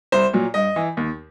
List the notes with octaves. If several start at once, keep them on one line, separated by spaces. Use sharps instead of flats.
C2 C5
A#2 F#3
G2 D#5
E3
D#2